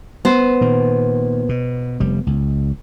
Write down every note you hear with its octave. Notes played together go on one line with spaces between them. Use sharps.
B3 C5
A#2 D#3
B2
F1 G3
C#2